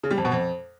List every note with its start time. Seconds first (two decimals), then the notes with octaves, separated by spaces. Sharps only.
0.03 C#3
0.11 G3
0.18 F2
0.25 B2
0.32 F2